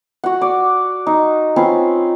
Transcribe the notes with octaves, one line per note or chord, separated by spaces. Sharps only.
F#4 F#5
D5
D#4
C4 C#4 F4 B4